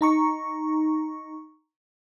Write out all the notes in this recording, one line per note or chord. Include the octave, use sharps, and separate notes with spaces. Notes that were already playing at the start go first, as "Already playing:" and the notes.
D#4 A#5 C#6